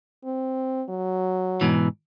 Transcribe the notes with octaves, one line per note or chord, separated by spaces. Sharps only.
C4
F#3
G#2 B2 E3